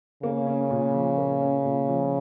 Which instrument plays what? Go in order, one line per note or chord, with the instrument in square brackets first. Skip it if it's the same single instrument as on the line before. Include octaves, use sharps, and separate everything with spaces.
[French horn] C#3 [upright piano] A#3
[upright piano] C#4
A#2
F3
A#3
C#4
A#2
F3